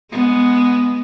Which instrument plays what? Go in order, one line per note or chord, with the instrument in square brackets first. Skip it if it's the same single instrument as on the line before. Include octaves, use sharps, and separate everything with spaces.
[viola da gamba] G#3 B3